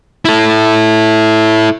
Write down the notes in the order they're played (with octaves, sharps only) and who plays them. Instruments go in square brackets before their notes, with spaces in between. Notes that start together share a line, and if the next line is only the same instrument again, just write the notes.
[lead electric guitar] E4 A4